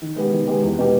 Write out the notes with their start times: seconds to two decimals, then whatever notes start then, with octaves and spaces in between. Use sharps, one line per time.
0.02 D#3
0.16 G#3 B3 G4
0.32 D#3
0.47 G#3 B3 G4
0.63 E2
0.78 B2 G#3 B3 G4